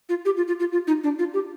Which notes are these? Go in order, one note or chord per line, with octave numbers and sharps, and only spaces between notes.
F4
G4
F4
F4
F4
F4
D#4
D4
F4
G4